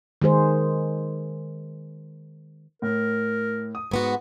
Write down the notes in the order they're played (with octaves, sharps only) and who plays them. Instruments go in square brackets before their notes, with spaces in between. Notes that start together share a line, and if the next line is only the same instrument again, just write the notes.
[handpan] D#3 G#3 G#4 C5
[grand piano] A2 [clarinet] A#4
[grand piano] D#6
[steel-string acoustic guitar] G#2 B3 F#4